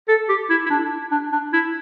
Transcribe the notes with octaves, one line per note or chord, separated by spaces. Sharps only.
A4
G4
E4
E4
D4
D4
D4
E4